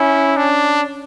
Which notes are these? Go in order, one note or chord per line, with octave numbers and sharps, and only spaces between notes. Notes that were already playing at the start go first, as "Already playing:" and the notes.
Already playing: C#4 E4
D4